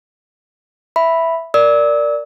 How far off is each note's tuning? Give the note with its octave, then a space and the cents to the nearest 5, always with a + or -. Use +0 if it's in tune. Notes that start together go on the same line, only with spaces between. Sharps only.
E5 +0 B5 +0
A#4 +0 D5 +0 E6 -35